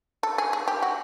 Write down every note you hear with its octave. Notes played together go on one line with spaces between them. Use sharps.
A4
G#4
G#4
G4
F#4